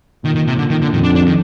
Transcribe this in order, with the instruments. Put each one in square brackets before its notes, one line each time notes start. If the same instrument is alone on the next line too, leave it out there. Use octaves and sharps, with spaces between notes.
[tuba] A#2 [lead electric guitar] D#3
[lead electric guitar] D#3
C3
D3
D#3
D3
[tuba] F2 [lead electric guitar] D#3
[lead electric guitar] D4
D4
D#3